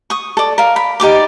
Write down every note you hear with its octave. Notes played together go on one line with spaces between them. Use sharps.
C#6 D#6
A4 D5
A#4 F5
B5
D#4 G4 D5 D6